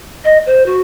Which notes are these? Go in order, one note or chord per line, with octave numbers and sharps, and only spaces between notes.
D#5
C5
F#4